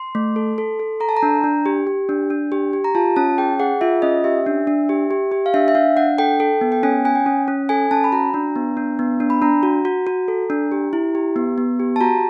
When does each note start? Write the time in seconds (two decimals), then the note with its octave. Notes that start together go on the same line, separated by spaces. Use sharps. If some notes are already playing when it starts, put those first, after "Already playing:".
Already playing: C6
0.15 A3
0.36 A4
0.58 A4
0.79 A4
1.00 A4 A#5
1.09 A5
1.17 A#5
1.23 D4
1.44 D4
1.66 G4
1.87 G4
2.09 D4
2.30 D4
2.52 G4
2.73 G4
2.84 A#5
2.95 F4 A5
3.16 C#4 A5
3.38 G#4 G5
3.59 G#4 F#5
3.81 F4 E5
4.02 C#4 D#5
4.24 G4 E5
4.46 D4
4.67 D4
4.89 G4
5.11 G4
5.32 G4
5.46 F5
5.54 D4 E5
5.68 E5
5.75 D4 F5
5.97 D4 F#5
6.18 A4 G5
6.40 A4
6.61 B3
6.72 G5
6.83 C#4 G#5
7.05 C#4 G#5
7.15 G5
7.26 C#4
7.48 C#4
7.69 A4 G#5
7.91 C#4 A5
8.04 B5
8.12 F#4 A#5
8.34 D4
8.56 B3
8.77 D4
8.99 B3
9.20 D4
9.30 B5
9.42 D4 A#5
9.63 F#4
9.85 F#4
10.07 F#4
10.28 A4
10.50 D4
10.72 G4
10.93 E4
11.15 G4
11.36 B3
11.58 B3
11.80 G4
11.96 A5
12.01 F#4 A#5